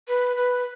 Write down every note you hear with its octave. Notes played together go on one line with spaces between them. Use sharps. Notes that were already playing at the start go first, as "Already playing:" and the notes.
B4
B4